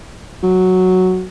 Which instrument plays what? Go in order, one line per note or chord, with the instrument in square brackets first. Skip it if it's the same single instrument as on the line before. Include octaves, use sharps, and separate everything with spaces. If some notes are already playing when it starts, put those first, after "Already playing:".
[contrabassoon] F#3